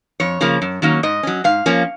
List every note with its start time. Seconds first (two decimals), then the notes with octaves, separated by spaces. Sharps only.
0.20 F2 C#5
0.41 C#3 F3 A#3
0.62 F#2
0.82 D#3 F#3 A#3 C#4
1.03 G#2 D#5
1.23 F#3 C#4
1.44 G#2 F5
1.66 F3 A#3 C#4